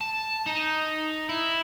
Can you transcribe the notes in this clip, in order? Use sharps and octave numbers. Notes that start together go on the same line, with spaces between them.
A5
D#4
E4